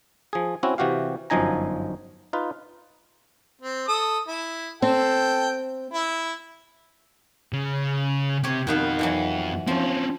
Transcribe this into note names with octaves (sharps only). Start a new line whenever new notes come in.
F3 G#4
C4 C#4 E4 F#4
C3 E3 F#4 G4 F5
G1 F#2 F3 D#4 G#5 A#5
D#4 F4 B4
C4
A4 D#6
E4
C4 A4 G5
E4
C#3
C3 G4 C#5
F2 B2 D#3 B3 F5
B2 E3 F#3
F3 C4 C#4